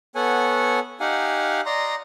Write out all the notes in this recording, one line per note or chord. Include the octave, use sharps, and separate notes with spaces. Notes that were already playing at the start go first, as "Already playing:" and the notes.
B3 A4 C#5 F#5 G#5
D#4 G4 F5 F#5 G#5
D5 D#5 A#5 C6